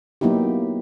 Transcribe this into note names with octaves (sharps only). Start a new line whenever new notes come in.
F#3 A#3 B3 D#4 E4 G4